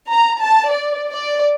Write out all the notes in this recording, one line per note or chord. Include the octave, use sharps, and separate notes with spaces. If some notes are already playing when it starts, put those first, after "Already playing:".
A#5
A5
D5
D5